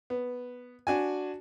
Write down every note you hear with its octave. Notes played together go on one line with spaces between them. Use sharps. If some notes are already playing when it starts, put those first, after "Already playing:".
B3
D4 F#4 G#5